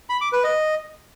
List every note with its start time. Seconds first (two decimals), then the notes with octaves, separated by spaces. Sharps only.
0.10 B5
0.21 D6
0.32 B4
0.44 D#5